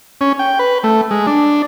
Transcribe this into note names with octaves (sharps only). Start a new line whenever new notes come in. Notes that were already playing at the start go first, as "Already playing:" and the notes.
C#4
G5
B4
A3
G#3
D4